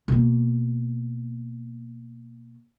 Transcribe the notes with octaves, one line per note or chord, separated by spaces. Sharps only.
B2 A#3